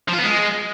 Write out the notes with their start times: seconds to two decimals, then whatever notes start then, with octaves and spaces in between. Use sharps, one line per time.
0.08 F3
0.13 F4
0.19 B3
0.24 G#3